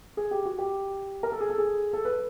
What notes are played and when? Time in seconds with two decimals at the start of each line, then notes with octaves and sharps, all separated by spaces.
0.17 G#4
0.31 G4
0.45 F#4
0.58 G4
1.23 A#4
1.32 A4
1.41 G#4
1.50 A4
1.58 G#4
1.93 A4
2.05 B4